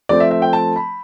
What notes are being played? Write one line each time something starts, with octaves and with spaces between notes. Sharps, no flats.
F3 A3 C4 D5
E5
E5
G5
A5
B5